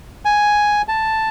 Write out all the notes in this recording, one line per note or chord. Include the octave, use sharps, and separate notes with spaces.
G#5
A5